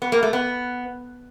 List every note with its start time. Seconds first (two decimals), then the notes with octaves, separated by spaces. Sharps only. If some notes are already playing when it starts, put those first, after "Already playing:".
0.02 B3
0.12 A#3
0.23 A3
0.33 B3